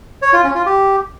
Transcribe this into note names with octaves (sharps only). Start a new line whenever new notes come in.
C#5
F4
C#4
F4
G4